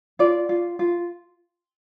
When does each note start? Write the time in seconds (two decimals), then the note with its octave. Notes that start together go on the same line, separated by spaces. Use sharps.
0.19 F4 D5
0.49 F4
0.79 F4